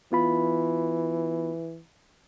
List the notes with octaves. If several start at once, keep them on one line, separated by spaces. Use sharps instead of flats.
E3 B3 F4 B5